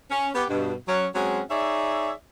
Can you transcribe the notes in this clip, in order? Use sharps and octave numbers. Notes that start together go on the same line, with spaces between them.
C#4
B3 G4
G2 B2
F#3 C#4 C#5
F#3 G#3 C4 C#4 F#4 G#4
D#4 G#4 C#5 D5 E5